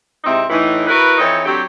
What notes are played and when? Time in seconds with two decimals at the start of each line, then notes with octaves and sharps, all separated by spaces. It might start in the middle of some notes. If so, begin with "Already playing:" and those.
0.24 G#2 C3 C4 D#4 E4 E5
0.50 A2 E3 D#4
0.88 E4 F#4 A#4 B4
1.18 F2 E3 C4 D#4 C#5
1.45 D3 F#3 C4 G4